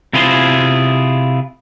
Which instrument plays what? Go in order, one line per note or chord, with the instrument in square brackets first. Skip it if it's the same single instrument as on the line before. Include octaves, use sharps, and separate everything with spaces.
[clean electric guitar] C3 E4 F4 G#4 C5 C6